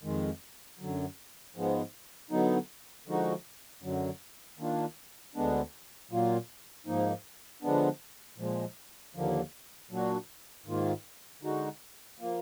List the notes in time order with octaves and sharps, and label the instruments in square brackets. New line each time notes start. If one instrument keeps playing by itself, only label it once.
[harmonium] F2 D#3 G#3
F#2 D3 F#3
G#2 F3 G#3 B3
D3 F#3 B3 D#4
D3 F3 G#3 D#4 F#4
F#2 D3 F#3
D#3 A#3 D4 F4
D2 D3 G#3 B3 D4
A#2 F#3 A#3 F4
G#2 F3 A#3 D#4
D3 F3 G#3 B3 D4
A#2 F3 G#3
D#2 D3 F3 A#3
A#2 F#3 D4 F#4
G#2 D#3 A#3 F4
D3 G#3 D#4 F#4
F3 A#3